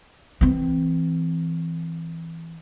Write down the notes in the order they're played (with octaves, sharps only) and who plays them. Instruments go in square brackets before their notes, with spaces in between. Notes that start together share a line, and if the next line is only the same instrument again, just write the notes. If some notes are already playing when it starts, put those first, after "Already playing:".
[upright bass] E3 C4